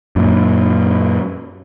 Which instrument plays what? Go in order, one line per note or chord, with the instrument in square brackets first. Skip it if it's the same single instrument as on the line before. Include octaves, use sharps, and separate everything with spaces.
[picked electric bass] F#2 A#2